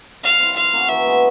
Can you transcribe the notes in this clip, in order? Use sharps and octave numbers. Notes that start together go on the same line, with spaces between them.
G3 F5
C4 E4
F3 F5
A#3 C#4 F#4
E3 E5
G#3 B3